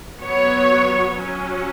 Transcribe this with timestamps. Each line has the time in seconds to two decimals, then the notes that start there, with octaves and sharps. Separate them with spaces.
0.21 F#3 B3 C#5
1.14 F#3 C#4